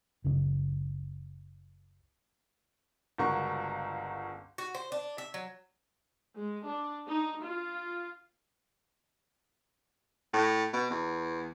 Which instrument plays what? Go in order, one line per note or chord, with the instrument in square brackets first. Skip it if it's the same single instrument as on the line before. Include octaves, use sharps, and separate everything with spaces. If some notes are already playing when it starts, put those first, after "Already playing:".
[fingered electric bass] F#1 C#2 C#3
[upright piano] G1 C#2 F#4 A#4 C#6
[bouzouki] F#4
C5
D4
E5
F#3
[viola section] G#3
D4
D#4
F4
[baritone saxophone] A2
B2
E2